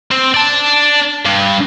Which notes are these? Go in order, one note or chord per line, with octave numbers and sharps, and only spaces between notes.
C4
D5 A5
G2